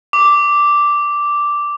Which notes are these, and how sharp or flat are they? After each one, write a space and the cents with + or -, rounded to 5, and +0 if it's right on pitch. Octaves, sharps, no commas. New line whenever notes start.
D6 -5